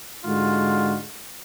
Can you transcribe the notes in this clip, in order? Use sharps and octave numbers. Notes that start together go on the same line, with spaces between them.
G#2 D3 G#3 F4 F#4